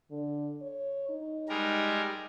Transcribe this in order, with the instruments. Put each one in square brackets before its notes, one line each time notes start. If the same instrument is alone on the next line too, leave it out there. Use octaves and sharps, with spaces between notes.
[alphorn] D3
C#5
D#4
[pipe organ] G3 G#3 A#4